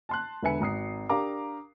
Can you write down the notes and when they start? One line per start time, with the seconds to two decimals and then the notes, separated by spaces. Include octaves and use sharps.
0.09 A5 C6 F#6
0.42 E1 D3 B4 E5 G#5 C#7
0.60 G#1 A#5 D#6 C7
1.09 D4 G4 A#4 F5 A#5 D6